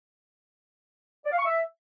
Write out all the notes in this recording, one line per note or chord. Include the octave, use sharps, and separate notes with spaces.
D5
F5
C#6
E5